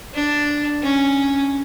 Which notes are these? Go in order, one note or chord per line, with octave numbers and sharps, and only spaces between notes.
D4
C#4